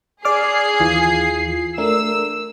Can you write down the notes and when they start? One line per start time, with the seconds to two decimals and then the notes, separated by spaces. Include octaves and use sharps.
0.25 G#4 D5 D6 F6 C7
0.80 D#2 E3 F4
1.78 A3 D4 A#4 E6